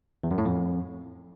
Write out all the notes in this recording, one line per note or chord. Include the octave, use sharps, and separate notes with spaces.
E2
F#2
A2
F2